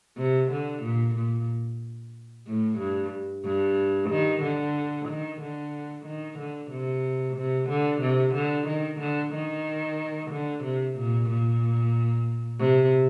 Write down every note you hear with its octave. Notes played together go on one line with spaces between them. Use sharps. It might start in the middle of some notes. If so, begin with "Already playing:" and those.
C3
D3
A#2
A#2
A2
G2
G2
D#3
D3
D#3
D3
D#3
D3
C3
C3
D3
C3
D3
D#3
D3
D#3
D3
C3
A#2
A#2
C3